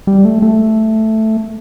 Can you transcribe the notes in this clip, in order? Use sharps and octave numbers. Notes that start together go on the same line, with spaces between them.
G3
A3
A3